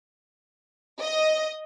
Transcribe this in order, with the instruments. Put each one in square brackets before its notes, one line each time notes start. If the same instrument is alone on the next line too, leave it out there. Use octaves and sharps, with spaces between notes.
[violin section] D#5